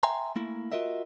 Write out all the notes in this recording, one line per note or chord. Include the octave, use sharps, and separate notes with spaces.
E5 G5 G#5 A#5 C6
A3 A#3 E4
F4 F#4 A#4 D#5 E5